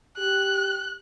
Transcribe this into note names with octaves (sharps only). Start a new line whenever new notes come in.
G4 F#6